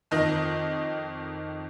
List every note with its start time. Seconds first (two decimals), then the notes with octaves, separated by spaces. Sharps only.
0.11 F2 D#3 D#5 A#6